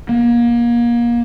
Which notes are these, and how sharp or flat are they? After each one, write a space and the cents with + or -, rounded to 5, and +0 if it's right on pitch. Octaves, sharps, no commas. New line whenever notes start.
A#3 +30